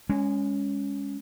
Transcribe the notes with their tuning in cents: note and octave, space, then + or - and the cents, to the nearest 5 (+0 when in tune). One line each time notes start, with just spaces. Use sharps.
G#3 -20 C#4 +5